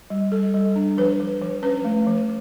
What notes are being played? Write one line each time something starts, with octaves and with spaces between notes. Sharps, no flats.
G3
G3 A4
G3
D4
F3 B4
F3
F3
C#4 B4
A3
F3